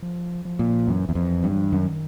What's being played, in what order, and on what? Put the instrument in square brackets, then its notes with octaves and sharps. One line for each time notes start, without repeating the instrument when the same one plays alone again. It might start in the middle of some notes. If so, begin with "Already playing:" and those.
[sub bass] F3
F3
[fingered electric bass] A#2
[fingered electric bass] F#2 [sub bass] E3
[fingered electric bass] E2
F2
G2
[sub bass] F#3
F3
E3
[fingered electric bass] F#2 [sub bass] D#3